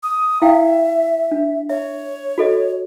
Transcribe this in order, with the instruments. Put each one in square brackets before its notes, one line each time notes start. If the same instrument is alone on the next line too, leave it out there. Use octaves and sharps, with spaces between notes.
[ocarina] D#6
[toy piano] E4 F5 G5 [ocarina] E5
[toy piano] D4
[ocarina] C#5 [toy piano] E5
[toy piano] F#4 A4 D#5